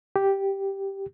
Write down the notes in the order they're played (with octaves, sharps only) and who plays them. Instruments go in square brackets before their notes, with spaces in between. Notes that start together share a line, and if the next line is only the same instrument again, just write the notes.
[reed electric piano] G4